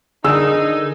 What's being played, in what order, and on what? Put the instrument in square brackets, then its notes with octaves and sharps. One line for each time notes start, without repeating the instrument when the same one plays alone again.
[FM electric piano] D3 D#3 [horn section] D#4 [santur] G#4 [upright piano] E6